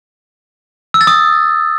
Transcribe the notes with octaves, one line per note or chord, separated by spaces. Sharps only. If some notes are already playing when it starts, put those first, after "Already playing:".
E6
A6
D#6